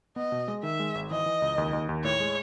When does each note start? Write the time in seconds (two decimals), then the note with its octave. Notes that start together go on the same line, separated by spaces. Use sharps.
0.16 B3 D#5
0.32 B2
0.48 G#3
0.63 D#3 E5
0.80 G#3
0.95 G#1
1.10 E3 D#5
1.26 E3
1.42 C#2
1.58 D#2
1.73 D#2
1.89 D#2
2.04 A2 C#5
2.20 G#3